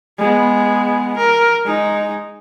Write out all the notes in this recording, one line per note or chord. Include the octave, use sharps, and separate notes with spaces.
G#3 B3
A#4
G#3 D#4